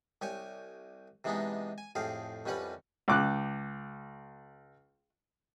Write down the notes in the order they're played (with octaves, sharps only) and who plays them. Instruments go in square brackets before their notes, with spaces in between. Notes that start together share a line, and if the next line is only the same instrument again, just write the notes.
[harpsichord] C2 G4 C#5 G#5
C3 E3 G#3 B3 D4 D#4
G#5
F2 A2 G4 G#4 F5
C2 F2 G3 C#4 B4 F#5
[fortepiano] C#2 D6 F#6